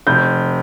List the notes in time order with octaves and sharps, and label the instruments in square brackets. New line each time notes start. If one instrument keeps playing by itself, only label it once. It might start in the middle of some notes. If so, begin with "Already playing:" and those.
[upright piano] F1 G6